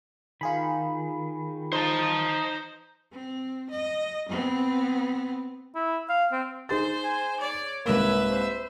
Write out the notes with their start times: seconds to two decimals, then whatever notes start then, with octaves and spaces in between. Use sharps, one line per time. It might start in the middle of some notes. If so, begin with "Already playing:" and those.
0.41 D#3 F4 G#4 B5
1.73 D#4 C5 A5
3.12 C4
3.71 D#5
4.29 B3 C4
5.75 E4
6.09 F5
6.32 C4
6.69 D#4 G#4 C5 A6
7.03 G#5
7.40 C#5 D5
7.85 C2 G#2 A#3 B4 E5
8.30 C5